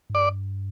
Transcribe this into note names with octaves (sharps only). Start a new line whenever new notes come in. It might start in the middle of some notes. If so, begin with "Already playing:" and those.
G#2
G2 D5